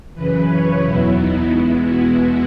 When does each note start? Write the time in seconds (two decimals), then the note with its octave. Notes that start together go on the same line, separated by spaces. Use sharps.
0.15 F#2 C#3 E3 B4
0.49 C#5
0.82 E2 B2 F#3 B3 E4
1.16 D#4
1.50 E2 B2 G#3 B3 E4
1.84 F#4